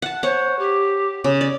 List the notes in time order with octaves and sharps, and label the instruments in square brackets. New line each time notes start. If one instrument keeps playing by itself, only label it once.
[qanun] F#5 A5
[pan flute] C5 [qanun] C#5 F#5
[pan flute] G4
[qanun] C#3
D5